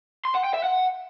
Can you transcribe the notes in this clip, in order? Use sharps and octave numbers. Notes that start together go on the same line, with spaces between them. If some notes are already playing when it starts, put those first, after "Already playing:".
C6
F#5
G5
E5
F#5